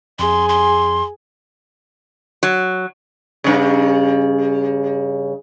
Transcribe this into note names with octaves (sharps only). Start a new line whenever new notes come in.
F2 G#4 C6
C6
F#3
G2 C#3